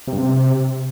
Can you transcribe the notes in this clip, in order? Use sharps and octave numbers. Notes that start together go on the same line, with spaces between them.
C3
G2
C3